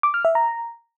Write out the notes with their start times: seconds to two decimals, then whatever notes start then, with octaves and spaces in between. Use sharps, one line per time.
0.03 D6
0.14 F6
0.25 E5
0.35 A#5